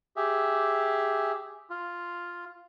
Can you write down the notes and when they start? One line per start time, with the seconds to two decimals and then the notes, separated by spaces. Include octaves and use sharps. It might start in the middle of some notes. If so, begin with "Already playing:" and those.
0.17 G4 G#4 E5
1.70 F4